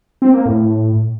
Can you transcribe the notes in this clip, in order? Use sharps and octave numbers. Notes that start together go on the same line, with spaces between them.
C4
A#3
A2